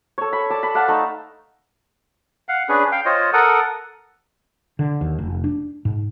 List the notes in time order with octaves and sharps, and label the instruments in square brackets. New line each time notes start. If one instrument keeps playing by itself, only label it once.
[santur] A4 C#5
B5
D5 A5
B5
D5 F5 F#5 A5
A3 D#4
[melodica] F5 F#5
C#4 D4 G#4 B4
F5 G5
F4 C5 C#5 D#5
A4 A#4 F#5 D#6
[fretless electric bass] D3
D#2
F1
D4
G#2